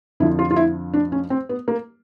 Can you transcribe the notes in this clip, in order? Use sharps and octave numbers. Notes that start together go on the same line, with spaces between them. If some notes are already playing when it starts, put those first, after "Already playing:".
F2 D3 F3 E4
F4
F4
E4
D4
C#4
C4
B3
A#3